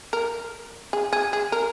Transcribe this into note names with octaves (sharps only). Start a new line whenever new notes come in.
A#4
G#4
G#4
G#4
A#4